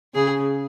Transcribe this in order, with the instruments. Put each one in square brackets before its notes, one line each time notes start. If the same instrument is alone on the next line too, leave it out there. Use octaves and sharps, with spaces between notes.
[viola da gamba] C#3 [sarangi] G#4